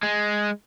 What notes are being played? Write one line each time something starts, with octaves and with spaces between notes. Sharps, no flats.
G#3